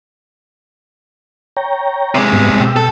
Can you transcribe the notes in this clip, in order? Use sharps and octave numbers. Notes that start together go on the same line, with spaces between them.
C#5 G5 A#5
C3 G#3
G#2 G3 B3
B2 G5 E6
A4